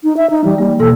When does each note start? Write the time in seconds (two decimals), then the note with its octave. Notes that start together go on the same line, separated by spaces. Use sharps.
0.04 D#4
0.17 E5
0.30 D#4
0.44 E3 G3
0.58 G3 A#3
0.80 B2 E3 A#3 A4